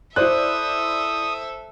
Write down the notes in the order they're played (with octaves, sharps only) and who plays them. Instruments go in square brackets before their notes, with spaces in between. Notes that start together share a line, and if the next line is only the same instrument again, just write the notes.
[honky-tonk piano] E4 D5 [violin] A4 E5 [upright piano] C5 F#6 [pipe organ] D#6